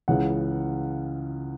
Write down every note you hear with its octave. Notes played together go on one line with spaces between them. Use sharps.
C#2 C#3 E3 F#5